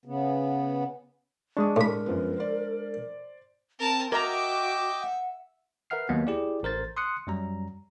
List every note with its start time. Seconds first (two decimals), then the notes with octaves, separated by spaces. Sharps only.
0.05 C#3 B3
1.57 G#3 D4 C#6 D#6
1.76 A2 A#4 B5
2.06 F#2 F3 B3
2.37 C5 D5
3.79 C4 A#4 A5
4.12 F#4 A#4 D#5 E5 G5 A#5 D6
5.01 F#5
5.90 A#4 B4 E5 F#5 F6 C7
6.09 D#2 F#3 A#3 B3
6.27 E4 G4 G#4 D5
6.63 A1 A#4 C5 A6
6.97 C6 D#6 F#6 C#7
7.27 F#2 F#3 G3 A#5